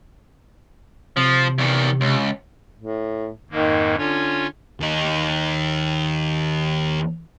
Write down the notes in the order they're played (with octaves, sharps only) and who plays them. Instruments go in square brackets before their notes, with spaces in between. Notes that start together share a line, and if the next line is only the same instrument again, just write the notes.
[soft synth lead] C3 [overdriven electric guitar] F3
[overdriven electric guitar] E2 D#3
C#2
[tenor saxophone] A2
[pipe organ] F2 G#2 A#3 [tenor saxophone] D#3
[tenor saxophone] D3 [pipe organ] C#4 F4 C#5
[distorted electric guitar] D#2 D#4